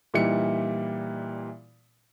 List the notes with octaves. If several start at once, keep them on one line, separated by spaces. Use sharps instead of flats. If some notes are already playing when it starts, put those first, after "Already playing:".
A#2 E3 G3 D#4 E4 C#7